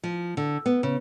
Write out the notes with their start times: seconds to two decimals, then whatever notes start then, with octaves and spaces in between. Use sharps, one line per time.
0.03 F3
0.37 D3
0.66 B3
0.83 C#3